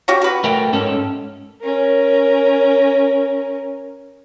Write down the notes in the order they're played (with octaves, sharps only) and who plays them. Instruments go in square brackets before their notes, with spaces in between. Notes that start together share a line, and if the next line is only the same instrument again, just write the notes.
[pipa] C#4 F#4 G4
F#4 B4
[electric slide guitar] A3 A#4 G5
G#2 C#4 A4
[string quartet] C#4 A#4